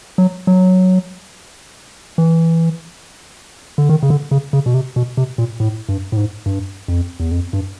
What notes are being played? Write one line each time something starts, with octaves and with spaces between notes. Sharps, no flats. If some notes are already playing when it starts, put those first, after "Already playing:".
F#3
F#3
E3
D3
D#3
C#3
D3
C#3
C#3
B2
C3
B2
C3
A#2
A2
G2
A2
G#2
G2
F2
E2
F2
G2